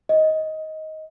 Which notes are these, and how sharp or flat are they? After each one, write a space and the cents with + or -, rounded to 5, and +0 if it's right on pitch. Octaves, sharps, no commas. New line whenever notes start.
D#5 +15